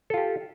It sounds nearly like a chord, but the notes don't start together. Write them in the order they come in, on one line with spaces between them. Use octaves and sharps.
A4 F4 G4